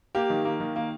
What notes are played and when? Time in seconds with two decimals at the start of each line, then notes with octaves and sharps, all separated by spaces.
0.15 A#3 G4
0.30 D#3
0.45 A#3
0.60 D#3
0.76 A#3